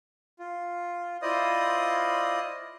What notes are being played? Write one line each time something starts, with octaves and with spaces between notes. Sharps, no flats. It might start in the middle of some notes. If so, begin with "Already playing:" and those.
F4
E4 F4 C5 D5 D#5 D#6